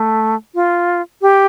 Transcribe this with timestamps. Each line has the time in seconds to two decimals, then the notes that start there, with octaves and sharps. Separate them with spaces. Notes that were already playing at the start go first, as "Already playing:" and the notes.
Already playing: A3
0.55 F4
1.22 G4